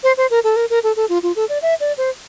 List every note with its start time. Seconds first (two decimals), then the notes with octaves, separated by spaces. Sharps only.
0.03 C5
0.17 C5
0.30 A#4
0.44 A4
0.56 A#4
0.70 A#4
0.83 A4
0.96 A4
1.09 F4
1.23 F4
1.36 A4
1.49 D5
1.62 E5
1.80 D5
1.98 C5